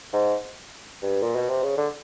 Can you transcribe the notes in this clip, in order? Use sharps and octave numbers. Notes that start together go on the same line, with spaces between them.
G#2
G2
A#2
B2
C3
C#3
D3